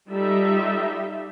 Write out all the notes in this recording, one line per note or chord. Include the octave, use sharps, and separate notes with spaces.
G3 D#4 F4 A4 E5